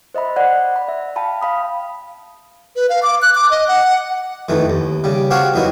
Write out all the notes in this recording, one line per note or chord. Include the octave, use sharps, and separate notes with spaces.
C5 D#5 E5 B5
D5 F#5 F#6
B5
E5
F5 G5 A5 B5
F5 B5 D#6
B4
F5
D6
F#6
D6
D#5
F#5
F2 D#3 E3 A3
D#2
C#3 G3
C4 F#4 G4 C#5 F5 A5
E2 F#3 D#4 E4 A#4